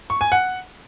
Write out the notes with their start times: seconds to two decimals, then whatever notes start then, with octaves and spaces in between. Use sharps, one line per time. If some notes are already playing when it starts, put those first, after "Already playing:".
0.10 C#6
0.21 G#5
0.32 F#5